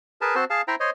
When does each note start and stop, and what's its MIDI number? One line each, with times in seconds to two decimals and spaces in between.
0.21 0.35 68
0.21 0.35 70
0.21 0.35 71
0.21 0.35 81
0.35 0.45 60
0.35 0.45 66
0.35 0.45 72
0.35 0.45 81
0.50 0.62 68
0.50 0.62 77
0.50 0.62 81
0.68 0.75 64
0.68 0.75 72
0.68 0.75 76
0.68 0.75 79
0.68 0.75 82
0.80 0.90 72
0.80 0.90 73
0.80 0.90 75